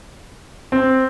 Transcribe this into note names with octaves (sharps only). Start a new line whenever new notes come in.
C4